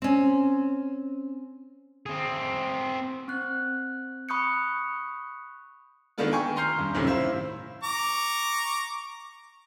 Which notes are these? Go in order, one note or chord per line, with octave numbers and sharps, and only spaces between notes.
C4 C#4
C4 G#4
C4 F#6
B5 C#6 D#6 F#6 G6 C#7
D#3 G#3 A3 B3 D4 F4
G5 G#5 C#6
A#5 C6 F6 G6 C7
D#1 G2
C#2 F#2 A2 C3 D#3
E4 C5 F5
A#5 C#6 D6